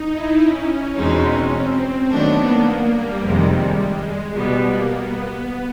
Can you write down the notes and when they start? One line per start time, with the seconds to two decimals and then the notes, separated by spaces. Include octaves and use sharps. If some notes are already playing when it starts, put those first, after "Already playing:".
Already playing: D#4
0.13 E4
0.41 C#4
0.96 E2 B2 G#3 C4 C#4 D#4
1.53 C4
2.09 D#3 F#3 A3 B3 D4
2.38 A#3
2.94 G3
3.22 F2 C3 D#3 G#3
3.49 G3
3.78 G#3
4.34 B2 G3 B3
4.62 A#3
4.90 B3